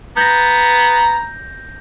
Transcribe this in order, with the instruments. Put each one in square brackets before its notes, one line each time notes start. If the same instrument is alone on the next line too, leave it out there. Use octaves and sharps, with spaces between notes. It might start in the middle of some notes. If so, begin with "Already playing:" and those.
[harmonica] B3 A#5 [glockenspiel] G6 A#6